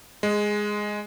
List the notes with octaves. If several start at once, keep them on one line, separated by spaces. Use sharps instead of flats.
G#3